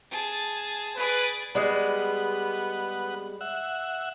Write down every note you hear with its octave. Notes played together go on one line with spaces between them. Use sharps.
G#4 A5
G#4 B4 D5
G3 G#3 B3 F#5
E5 F#5